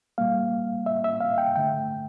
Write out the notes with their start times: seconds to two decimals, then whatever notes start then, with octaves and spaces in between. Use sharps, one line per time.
0.18 A#2 G3 A#3 F5
0.86 E5
1.04 E5
1.21 F5
1.38 G5
1.55 G2 D3 A3 G5